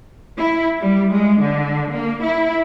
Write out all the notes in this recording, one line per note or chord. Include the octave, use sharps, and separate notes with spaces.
E4
G3
G#3
D3
A#3
E4